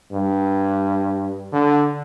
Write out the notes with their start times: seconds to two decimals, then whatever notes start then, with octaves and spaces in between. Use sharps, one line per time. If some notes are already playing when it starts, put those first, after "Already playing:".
0.13 G2
1.53 D3